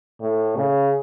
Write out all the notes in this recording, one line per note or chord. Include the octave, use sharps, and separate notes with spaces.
A2
C#3